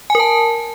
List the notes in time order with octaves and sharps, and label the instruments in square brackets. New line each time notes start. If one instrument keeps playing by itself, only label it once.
[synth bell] G#5
A#4
A5